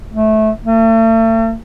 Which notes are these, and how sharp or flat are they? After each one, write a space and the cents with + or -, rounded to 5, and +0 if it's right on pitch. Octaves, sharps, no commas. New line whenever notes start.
A3 -20
A3 +40